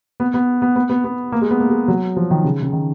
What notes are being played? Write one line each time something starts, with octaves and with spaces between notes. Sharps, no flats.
B3
B3
B3
B3
B3
B3
A#3
G#3
B3
A#3
G#3
F#3
F3
D#3
C#3
C#3
D#3